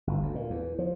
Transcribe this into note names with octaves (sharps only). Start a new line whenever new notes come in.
G1
D2
A#2
E2
F3